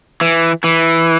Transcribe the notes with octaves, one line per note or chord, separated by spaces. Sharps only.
E3
E3